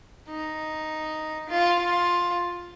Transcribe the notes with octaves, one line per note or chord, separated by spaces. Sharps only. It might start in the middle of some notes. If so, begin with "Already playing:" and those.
D#4
F4
F4